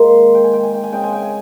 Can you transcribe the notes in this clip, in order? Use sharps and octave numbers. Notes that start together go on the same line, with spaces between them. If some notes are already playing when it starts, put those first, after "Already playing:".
Already playing: G#2 D#3 A#3 C6
G5
G#5
G5
G#5
G5
G#5
C#3 G#3 C4 G5
G#5
G5
G#5